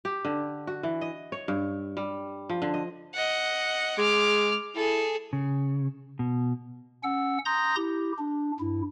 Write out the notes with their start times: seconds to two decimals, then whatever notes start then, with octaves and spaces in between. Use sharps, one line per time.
0.05 G4
0.25 D3
0.67 F#4
0.83 E3
1.01 D#5
1.32 C#5
1.48 G2
1.97 G3
2.50 F3
2.62 D3
2.74 D#5
3.15 D#5 F#5
3.98 G#3 D6 F6
4.75 E4 G#4 A4
5.33 C#3
6.19 B2
7.03 C#4 F#5 E6
7.45 A#5 C6 D#6 G6 A#6
7.76 E4 G4
8.18 D4
8.60 G2 E4